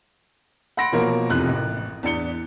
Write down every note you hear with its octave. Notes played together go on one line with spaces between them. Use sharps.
F#5 B5 C6 A#6 D7
B2 F3 A#3 A#4 C#5
F1 C3 F3 E4 F#6
A1
E2 D4 C#7 G7